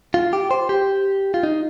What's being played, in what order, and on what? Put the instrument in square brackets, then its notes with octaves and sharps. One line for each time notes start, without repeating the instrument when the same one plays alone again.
[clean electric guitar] F4
G4
C5
G4
F4
D#4